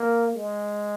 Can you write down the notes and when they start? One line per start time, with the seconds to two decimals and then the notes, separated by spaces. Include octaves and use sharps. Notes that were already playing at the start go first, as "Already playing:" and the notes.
Already playing: A#3
0.35 G#3